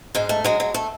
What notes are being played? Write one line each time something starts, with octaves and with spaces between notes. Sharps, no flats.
G#2 G#3
A3
F#3 G#3
G#3
A3